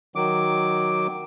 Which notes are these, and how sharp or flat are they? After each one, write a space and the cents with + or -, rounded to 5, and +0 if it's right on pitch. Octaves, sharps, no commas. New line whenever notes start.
D#3 +0 F#3 +0 D6 +0